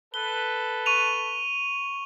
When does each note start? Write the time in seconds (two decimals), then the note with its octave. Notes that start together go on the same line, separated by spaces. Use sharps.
0.14 A4 B4 G7
0.86 C#6 D#7 F7